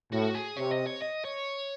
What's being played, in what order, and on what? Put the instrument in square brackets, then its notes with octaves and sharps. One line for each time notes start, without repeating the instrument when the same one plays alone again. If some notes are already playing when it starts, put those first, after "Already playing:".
[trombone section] A2 [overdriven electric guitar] F#4
[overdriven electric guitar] G#4
[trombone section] C3 [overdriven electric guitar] C#5
[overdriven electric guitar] D#5
C#5
D#5
C#5